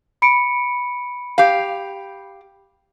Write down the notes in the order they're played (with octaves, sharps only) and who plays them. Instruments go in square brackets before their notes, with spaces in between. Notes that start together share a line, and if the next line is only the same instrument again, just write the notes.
[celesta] B5 C#7 D7
[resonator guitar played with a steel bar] G4 F5